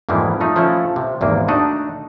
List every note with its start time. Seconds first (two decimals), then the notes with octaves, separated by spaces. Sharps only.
0.09 F2 G#2 E3 G3 G#3 A#3
0.40 F3 A3 D#4
0.56 F3 A3 C#4 E4 A4
0.96 C3
1.21 G#1 E2 C3 A#3
1.48 A3 D4 D#4 F#4 D#5 F#5